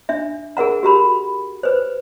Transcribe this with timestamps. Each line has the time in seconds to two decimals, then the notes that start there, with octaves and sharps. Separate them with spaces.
0.09 D4 E5
0.57 G#4 A#4 F#5 A#5
0.83 F#4 G4 A#5 B5
1.63 B4 C5